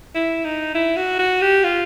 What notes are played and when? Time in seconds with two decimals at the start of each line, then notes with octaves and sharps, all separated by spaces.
0.15 E4
0.45 D#4
0.74 E4
0.96 F#4
1.19 F#4
1.42 G4
1.64 F4